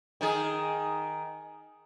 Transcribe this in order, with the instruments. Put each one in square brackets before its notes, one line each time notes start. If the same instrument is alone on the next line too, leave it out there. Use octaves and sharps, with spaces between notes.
[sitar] D#3 D#4 G#4